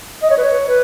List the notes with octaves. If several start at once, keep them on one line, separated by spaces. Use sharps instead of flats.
D#5
C#5
B4
C#5
B4